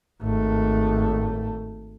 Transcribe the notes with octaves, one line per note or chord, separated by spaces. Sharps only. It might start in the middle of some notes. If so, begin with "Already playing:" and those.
G#1 A3